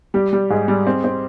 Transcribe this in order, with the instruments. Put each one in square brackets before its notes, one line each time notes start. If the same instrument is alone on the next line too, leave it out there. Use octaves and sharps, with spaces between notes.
[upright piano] G3 [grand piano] G4
[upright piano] G3
[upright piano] G#2 [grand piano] G#4
[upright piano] G3
C4
C4